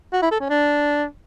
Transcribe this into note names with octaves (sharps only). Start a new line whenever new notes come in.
F#4
E4
A4
C#4
D4